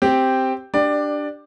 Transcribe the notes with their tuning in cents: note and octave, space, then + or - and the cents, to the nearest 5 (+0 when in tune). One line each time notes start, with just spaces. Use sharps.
C4 +0 G4 +0
D4 +0 G4 +0 D5 +15